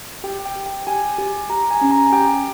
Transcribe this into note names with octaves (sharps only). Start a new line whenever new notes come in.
G4 G5
G5
G4
G5
G4 G#5
G4
G4 A#5
G#5
C#4
A#5
G#5
G4 G5